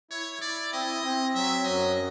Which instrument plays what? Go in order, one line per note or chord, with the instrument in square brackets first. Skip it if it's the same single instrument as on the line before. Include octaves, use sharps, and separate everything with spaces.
[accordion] E4 [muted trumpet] C#5
[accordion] E4 [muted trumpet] D5
[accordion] C4 [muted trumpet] D#5
[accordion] C4
[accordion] F#3 [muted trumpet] E5
[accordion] F#2 [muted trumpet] D#5